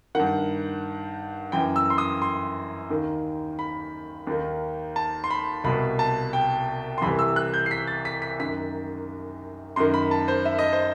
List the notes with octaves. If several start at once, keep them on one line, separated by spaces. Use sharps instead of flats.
G2 D#3 F#5
F#2 E3 G5
E6
C6
D#6
C6
D#2 D#3
B5
D#2 D#3
A5
C6
B5
C2 B2 B5
A5
G5
C6
C2 C3 E3 B5
E6
F#6
G6
C7
B6
A6
B6
B6
F#2 D#3 B6
F#2 D#3 C6
B5
A5
C5
E5
D#5
C5